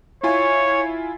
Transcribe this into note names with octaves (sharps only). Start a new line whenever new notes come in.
E4 F4 C#5 G#5